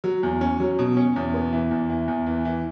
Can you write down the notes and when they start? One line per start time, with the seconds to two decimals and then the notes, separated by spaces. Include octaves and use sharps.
0.04 F#3
0.23 E2
0.41 C#4
0.60 F#3
0.79 B2
0.97 C#4
1.16 E2
1.34 B3
1.53 E3
1.71 E2
1.90 E3
2.08 E2
2.26 E3
2.45 E3